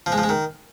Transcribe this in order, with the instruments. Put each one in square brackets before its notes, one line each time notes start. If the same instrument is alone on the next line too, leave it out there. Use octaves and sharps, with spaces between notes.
[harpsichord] F3
G#3
F3
G#3
D#3